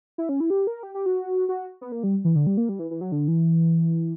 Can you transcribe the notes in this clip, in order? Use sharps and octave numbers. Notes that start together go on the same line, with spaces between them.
E4
C#4
E4
G4
A#4
G4
G4
F#4
F#4
B3
A#3
G3
E3
D3
G3
A#3
G3
E3
E3
F#3
D3
E3